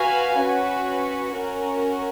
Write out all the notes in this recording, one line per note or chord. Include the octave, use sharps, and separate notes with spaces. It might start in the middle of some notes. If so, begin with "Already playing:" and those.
Already playing: F#4 B4 F5 G#5
C#4 F#4 B4
C#4 F#4 A#4